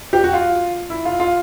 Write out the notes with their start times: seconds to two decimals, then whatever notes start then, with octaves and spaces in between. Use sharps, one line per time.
0.13 G4
0.24 F#4
0.33 F4
0.90 E4
1.05 F4
1.20 F4